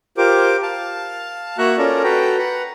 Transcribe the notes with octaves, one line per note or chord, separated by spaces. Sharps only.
F4 G4 A#4 C5 D6
F5 A5
A#3 F#4 E5 A#5 C#6 F#6
C#4 F4 A4 A#4 D5 A#5
F#4 A4 B4 G5 A#5
B4 F#5 A#5